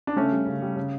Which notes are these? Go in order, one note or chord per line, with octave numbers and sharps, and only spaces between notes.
D4
C#3 A3 C#4
G3
C#3
G3
C#3